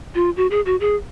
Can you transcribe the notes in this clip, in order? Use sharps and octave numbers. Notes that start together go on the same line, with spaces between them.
F4
F#4
G#4
F#4
G#4